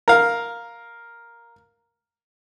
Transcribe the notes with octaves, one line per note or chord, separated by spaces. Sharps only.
A#4 F5